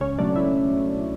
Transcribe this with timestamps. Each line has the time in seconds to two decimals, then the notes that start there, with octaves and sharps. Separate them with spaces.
0.01 C#2 C#4 C#5
0.19 B2 F#3 A3 D4 D5
0.36 C#2 E4 E5